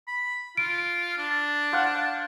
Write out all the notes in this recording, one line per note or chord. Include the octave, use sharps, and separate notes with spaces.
B5
F4 D7
D4
C5 F5 F#5